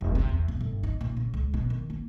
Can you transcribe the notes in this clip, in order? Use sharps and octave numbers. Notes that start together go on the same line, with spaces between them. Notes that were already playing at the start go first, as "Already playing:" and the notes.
E1
C3
E2
B2
G1
D#4
A#2
C#3
C#2
B2
D#3
A#3